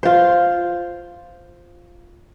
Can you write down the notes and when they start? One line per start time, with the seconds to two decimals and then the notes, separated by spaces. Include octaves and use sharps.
0.03 F4 C5